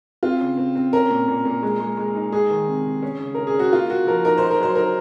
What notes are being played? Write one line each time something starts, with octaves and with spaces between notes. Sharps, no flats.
C4 F4
C#3
C4
C4
C#4 A#4
A#2
A#2
A#2
G#3
G#3
G#3
D#4
G#3 G#4
D#3
C3
C3
C#4
C#3
C#4 A#4
G#4
C#4
F#4
A#3 F4
A#3 F#4
F3 A#4
D#4 A#4
D#4 C5
A#4
F#3 C5
D#4 A#4